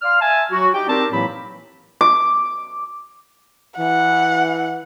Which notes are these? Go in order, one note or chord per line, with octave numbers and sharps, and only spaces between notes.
D5 F5 C6 F6
E5 G#5 A5
F#3 F#4
D#4 G4 G5
C4 D#4 G4 A#4 D5 A5
A2 E3 F#3 A#3 G4 B5
D6
E3 F#5